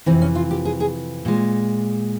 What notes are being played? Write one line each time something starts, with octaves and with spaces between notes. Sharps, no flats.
F2 C3 E3 C4
C#4
F4
G4
G#4
G#4
A#2 G#3